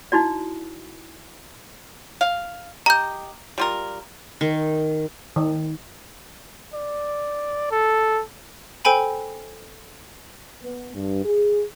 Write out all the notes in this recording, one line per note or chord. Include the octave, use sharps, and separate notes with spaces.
D#4 E4 F#4 D5
F5
G4 D#5 A#5 G6
G3 F4 A#4
D#3
D#3
D5
A4
A4 C5 G5 G#5 B5
B3
G2
G#4